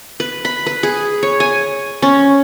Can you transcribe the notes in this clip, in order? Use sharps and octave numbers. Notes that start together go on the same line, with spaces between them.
B4
B5
B4
G#4
C#5
G#5
C#4